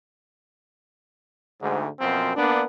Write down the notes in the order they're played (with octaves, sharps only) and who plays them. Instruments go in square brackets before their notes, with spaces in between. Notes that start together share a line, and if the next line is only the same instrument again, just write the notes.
[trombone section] D2 G#2
F#2 B2 F3 C4
A#3 B3 D4